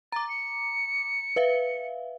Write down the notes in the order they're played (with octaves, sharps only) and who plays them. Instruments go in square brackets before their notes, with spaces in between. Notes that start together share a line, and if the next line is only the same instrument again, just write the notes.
[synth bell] A#5 D6 [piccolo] A6
[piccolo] C#7
[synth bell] B4 E5 F5